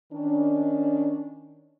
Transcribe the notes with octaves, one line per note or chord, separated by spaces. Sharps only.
D#3 C#4 D4